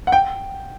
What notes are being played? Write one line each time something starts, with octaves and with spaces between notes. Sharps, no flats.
F#5
G5